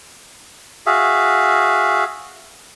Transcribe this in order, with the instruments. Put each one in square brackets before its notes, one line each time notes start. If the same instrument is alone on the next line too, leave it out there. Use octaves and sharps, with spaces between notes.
[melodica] F#4 G#4 E5 F5